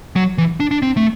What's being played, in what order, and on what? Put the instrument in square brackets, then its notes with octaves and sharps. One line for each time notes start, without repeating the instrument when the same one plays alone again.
[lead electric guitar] F#3
E3
D4
D4
C4
A3